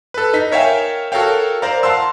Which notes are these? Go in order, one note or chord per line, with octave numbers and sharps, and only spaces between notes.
A4 B4
D#4 B6
A#4 C#5 E5 F5 G5 G#5
F#4 A4 A#4 C#5 F5 G5
A#4 C5 D5 F5 A#5
F5 F#5 A5 C6 E6